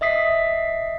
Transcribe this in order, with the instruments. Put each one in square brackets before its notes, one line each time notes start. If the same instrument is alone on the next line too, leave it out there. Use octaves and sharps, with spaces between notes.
[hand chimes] D#5 E5 D#6 B6 C7